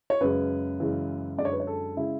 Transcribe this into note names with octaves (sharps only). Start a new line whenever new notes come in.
C#5
F#2 C#3 G#3 B4
F#2 C#3 E3 G#3
F#2 D3 G#3 D5
C#5
B4
C#5
A4
C#3 G#3 E4